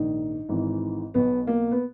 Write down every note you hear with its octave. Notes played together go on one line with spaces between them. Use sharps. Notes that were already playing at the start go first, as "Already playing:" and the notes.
Already playing: A#1 G#2 D#3 D#4
G#1 G#2 E3
B1 B2 B3
A#3
B3